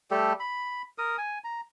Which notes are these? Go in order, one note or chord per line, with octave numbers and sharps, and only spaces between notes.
G3 A3 G4 A4
B5
A#4 D#6
G#5
A#5